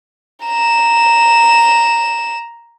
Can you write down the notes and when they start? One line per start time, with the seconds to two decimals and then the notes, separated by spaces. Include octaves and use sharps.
0.45 A#5 E7